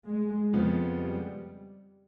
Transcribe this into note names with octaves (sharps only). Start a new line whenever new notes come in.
G#3
F2 C#3 F3 G#3 B3
G3